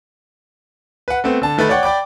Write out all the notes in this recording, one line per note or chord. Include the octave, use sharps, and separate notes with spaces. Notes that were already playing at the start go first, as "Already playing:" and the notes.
B4 F#5
A3 B3 C4
D3 A5
D#3 A3 B4 B5 A6
C#5 D5 F#5 G5
D5 G5 B5 D6